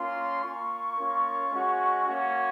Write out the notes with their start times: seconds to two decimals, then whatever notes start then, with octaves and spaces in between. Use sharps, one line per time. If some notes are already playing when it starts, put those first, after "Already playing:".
Already playing: A#3 C#4 F4 C6
0.42 A#3 F4 C#6
0.97 A#3 C#4 F4
1.52 G#3 C#4 F#4
2.06 A#3 C#4 F#4